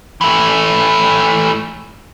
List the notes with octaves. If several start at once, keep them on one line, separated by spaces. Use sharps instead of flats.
E3 A3